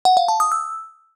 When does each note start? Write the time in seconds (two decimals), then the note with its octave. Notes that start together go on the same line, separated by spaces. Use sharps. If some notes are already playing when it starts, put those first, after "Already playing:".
0.05 F#5
0.17 F5
0.28 A5
0.40 D#6
0.52 E6